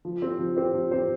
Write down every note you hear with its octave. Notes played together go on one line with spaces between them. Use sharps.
F3
C4 G4 C5
F3
C4 G4 C5
F3
C4 G4 C5